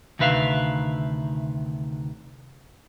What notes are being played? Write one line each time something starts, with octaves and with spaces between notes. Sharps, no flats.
D2 C3 D#3 B4 E5 F5